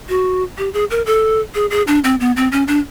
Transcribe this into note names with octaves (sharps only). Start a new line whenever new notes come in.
F#4
G4
G#4
A#4
A4
G#4
G#4
D4
C4
B3
C4
C#4
D4